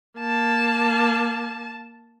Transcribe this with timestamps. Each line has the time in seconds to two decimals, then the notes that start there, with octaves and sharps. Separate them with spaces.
0.18 A#3 A5